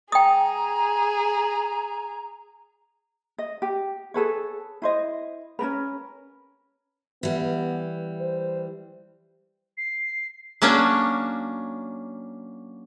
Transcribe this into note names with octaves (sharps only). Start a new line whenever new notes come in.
G#4 G5 A#5 D#6
D#5
G4
G#4 A4 B4 C#5
E4 C5 D#5
C#4 D4 A#4 B4
E3 G3 B3
C5
C7
F#3 A#3 C#4 D4